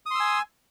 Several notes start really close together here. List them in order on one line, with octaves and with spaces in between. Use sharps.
D#6 C6 E6 G#5